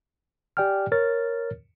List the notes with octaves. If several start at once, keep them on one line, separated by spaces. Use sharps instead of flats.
G4 D5 G5 G#5 F6
A#4 C#5 F6 A6